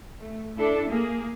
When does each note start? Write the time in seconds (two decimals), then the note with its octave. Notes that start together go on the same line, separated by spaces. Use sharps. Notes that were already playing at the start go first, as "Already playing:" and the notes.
0.19 A3
0.57 D4 E4 A4
0.88 A#3 G#4